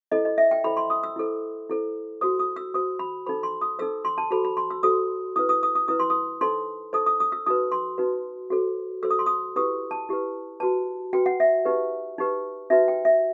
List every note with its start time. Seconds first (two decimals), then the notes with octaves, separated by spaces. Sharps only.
0.12 E4 A4 C5 D#5
0.25 D#5
0.38 E5
0.51 G5
0.64 E4 A4 C5 B5
0.77 C6
0.90 D#6
1.03 E6
1.16 E4 A4 C5
1.69 E4 A4 C5
2.21 F#4 C5 D#6
2.39 D#6
2.56 E6
2.74 F#4 C5 D#6
2.99 B5
3.26 D#4 A4 C5 B5
3.43 C6
3.61 D#6
3.79 D#4 A4 C5 E6
4.05 C6
4.18 A5
4.31 F#4 A4 C5 B5
4.45 B5
4.57 C6
4.70 E6
4.83 F#4 A4 C5 D#6
5.36 E4 B4 D#6
5.49 D#6
5.63 D#6
5.75 D#6
5.88 E4 B4 D#6
5.99 C6
6.10 D#6
6.41 D#4 A4 C5 C6
6.93 D#4 A4 C5 D#6
7.06 D#6
7.20 D#6
7.32 E6
7.46 D#4 F#4 B4 D#6
7.72 C6
7.98 D#4 F#4 B4
8.50 F#4 A4 C5
9.03 F#4 A4 C5 E6
9.10 D#6
9.19 C6
9.26 D#6
9.56 E4 G4 B4 D#6
9.91 A5
10.09 E4 G4 B4
10.60 F#4 B4 A5
11.13 F#4 B4 G5
11.26 F#5
11.40 E5
11.65 D#4 G4 B4
12.18 D#4 G4 B4
12.70 D#4 F#4 B4 E5
12.88 G5
13.05 E5